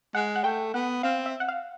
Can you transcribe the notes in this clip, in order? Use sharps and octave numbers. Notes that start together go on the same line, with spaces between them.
G#3 F#5
F#5
A3 G5
B3 F#5
C4 F5
E5
F#5
F5